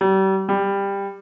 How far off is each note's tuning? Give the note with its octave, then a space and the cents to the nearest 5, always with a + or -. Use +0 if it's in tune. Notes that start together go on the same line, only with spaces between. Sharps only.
G3 -35
G3 +15